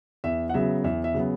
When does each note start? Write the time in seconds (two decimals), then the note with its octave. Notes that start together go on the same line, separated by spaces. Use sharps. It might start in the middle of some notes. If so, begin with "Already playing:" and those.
0.24 E2 E5
0.49 F#5
0.54 C#3 F#3 B3 E5
0.84 E2 E5
1.04 E5
1.14 C#3 F#3 B3